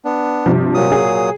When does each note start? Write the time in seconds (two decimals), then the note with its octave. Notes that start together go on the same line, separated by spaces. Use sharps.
0.05 B3 D4
0.46 G2 C3 F3
0.74 A#2 F#3 D#6
0.92 G#4